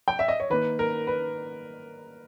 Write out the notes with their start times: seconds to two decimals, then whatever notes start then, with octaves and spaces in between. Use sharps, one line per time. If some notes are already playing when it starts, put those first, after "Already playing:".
0.08 G5
0.19 E5
0.28 D#5
0.40 C#5
0.50 D#3 A#3 B4
0.79 A#4
1.07 B4